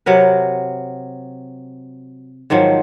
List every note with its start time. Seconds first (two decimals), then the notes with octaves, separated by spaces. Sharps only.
0.06 C3 F#3 A#4 B4
2.50 G#2 D#3 F3 F#3